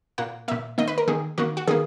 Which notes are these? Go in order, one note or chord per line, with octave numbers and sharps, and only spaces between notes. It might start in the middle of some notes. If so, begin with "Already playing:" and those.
A#2 A#3 F#5
A#2 A#3 E5
D#3 A#3 D#5
B4
A#4
D#3 A#3 G#4
D#3 A#3 F#4
F#4
D#3 A#3 G#4